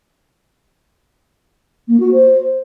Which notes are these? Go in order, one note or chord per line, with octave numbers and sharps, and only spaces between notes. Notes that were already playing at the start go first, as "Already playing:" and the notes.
A#3
F#4
C5